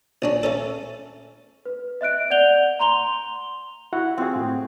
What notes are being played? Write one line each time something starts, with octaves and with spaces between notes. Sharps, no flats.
A#1 C#4 D4
A3 C#4 A4
B4
D#5 E5 F#6 D7
D5 F#5 G6 F7 G7
A#5 C6 F7 G7
E4 F#4 F#5
C4 F4 F#4 G#4
A2